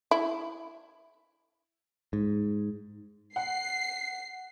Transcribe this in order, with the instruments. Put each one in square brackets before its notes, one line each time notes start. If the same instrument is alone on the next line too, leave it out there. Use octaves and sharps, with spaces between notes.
[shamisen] E4
[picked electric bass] G#2
[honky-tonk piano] F#5 [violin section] C7